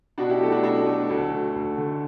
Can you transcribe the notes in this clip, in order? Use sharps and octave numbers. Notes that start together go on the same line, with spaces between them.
B2 D4 F#4
E4 G4
F#3 A3 F#4 A4
D4 F#4
B2 D4 F#4
F#3 A3
D2 F#4 A4
D3 A3
D2
D3 A3